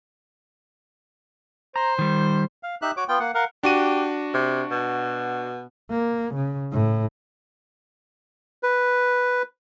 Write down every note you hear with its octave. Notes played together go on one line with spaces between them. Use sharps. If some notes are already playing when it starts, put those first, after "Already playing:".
C5 A#5
D#3 G3
F5
D#4 G4 E5 F#6
F#4 C#5 D6
B3 F4 G5
A#3 F#5
A#4 F5 F#5
D4 F#4 G4 D#7
C3
B2
A#3
C#3
A2
B4